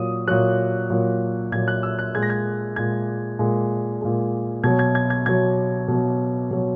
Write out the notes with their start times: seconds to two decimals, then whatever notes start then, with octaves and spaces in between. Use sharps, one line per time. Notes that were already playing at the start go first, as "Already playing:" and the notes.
Already playing: A#2 F#3 D#6
0.28 A#2 F#3 F#6
0.90 A#2 F#3
1.52 A#2 G#6
1.55 F#3
1.68 F#6
1.83 E6
1.99 F#6
2.14 A#2 G#3 G#6
2.22 A#6
2.30 G#6
2.76 A#2 G#3 G#6
3.39 A#2 G#3
4.02 A#2 G#3
4.64 B2 F#3 G#6
4.79 G#6
4.95 G#6
5.10 G#6
5.26 B2 F#3 G#6
5.88 B2 F#3
6.51 B2 F#3